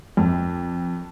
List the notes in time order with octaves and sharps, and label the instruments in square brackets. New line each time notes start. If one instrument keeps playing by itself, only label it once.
[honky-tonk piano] F2